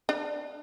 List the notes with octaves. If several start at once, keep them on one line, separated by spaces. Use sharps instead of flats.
D4